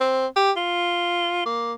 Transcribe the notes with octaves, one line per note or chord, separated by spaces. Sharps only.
C4
G4
F4
A#3